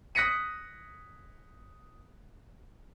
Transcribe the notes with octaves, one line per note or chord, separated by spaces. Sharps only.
D#6 F#6 A#6 B6 C#7 D#7